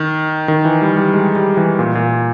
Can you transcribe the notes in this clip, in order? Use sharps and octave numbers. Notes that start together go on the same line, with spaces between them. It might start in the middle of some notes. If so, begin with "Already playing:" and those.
Already playing: D#3
D#3
E3
G3
G3
G#3
G3
E3
A#2
A#2